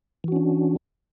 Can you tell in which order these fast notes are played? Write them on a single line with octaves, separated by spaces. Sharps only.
E3 F#4 C#4 D4